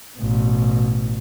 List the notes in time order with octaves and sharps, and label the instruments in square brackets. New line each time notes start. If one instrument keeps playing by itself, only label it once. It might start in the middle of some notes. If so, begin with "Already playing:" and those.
[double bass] A1 B2